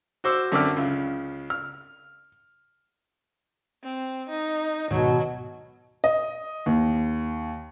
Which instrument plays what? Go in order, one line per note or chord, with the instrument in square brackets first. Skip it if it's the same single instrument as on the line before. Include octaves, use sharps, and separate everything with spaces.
[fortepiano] F#4 C5 D6 E6
F#2 D3 C4 D5 E5 F6
C#2 C#3
F6
[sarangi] C4
D#4
[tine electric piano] D2 G#2 D#3 [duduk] B2 [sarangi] F#3
[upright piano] D#5
D#2